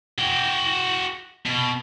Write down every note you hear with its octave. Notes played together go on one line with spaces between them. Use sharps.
F#4 G5
B2